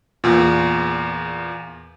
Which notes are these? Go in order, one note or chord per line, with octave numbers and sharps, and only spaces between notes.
E2 A#2